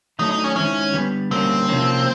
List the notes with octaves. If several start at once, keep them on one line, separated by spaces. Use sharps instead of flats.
D#3 F#3 A3 D4 D#4
D#4
C#4
D#3 G#3 C4 C#4 E4
D3 G3 B3
D3 G3 A#3 C4 C#4
C3 F3 A#3 C#4